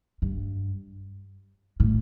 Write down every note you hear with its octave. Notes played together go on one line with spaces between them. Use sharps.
G2
A2